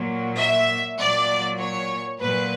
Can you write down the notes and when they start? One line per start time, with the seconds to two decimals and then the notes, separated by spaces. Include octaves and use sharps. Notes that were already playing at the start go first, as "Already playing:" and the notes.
Already playing: A#2 F#3
0.37 E5
0.97 A#2 F#3 D5
1.58 C#5
2.18 A#2 F#3 B4